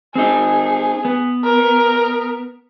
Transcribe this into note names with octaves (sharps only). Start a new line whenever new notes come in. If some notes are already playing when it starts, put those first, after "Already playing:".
C4 D#4 G#4
B3
A#4